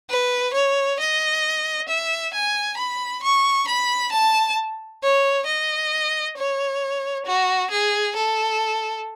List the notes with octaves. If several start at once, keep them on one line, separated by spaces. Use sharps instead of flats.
B4
C#5
D#5
E5
G#5
B5
C#6
B5
A5
C#5
D#5
C#5
F#4
G#4
A4